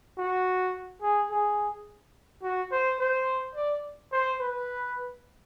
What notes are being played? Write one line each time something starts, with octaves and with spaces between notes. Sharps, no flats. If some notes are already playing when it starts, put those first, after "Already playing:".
F#4
G#4
G#4
F#4
C5
C5
D5
C5
B4